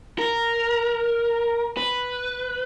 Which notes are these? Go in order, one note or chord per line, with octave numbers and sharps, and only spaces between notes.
A#4
B4